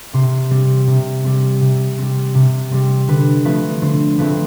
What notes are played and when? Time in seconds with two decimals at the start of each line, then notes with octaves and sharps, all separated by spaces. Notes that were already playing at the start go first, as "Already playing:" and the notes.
0.13 C3 C5
0.51 G3 C4
0.87 C3
1.24 G3 C4
1.61 C3
1.98 G3 C4
2.35 C3
2.72 G3 C4
3.08 D3 B4
3.45 F3 A3 C4 B4
3.82 D3 C5
4.19 F3 A3 C4 B4